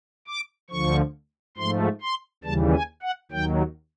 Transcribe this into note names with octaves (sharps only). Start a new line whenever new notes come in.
D6
D2 D3 F3 C#6
G#2 F3 A3 C6
C6
D#2 C#3 E3 G3 A5
G#5
F#5
D#2 D#3 F#3 G5